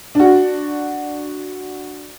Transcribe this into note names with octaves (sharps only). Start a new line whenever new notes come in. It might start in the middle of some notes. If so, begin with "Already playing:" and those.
D4 F#4